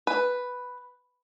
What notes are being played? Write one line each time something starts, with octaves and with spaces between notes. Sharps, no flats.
B4